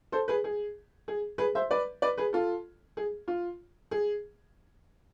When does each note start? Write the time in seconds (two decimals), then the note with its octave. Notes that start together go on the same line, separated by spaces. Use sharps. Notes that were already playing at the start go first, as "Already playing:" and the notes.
0.12 A4 C5
0.28 G#4 B4
0.44 G#4
1.08 G#4
1.38 G#4 B4
1.55 C5 E5
1.71 B4 D5
2.02 B4 D5
2.18 G#4 B4
2.33 F4 A4
2.97 G#4
3.28 F4
3.91 G#4